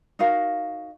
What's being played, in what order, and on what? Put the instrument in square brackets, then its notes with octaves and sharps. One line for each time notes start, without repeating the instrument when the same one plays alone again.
[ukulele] D#4 F#4 A#4 F5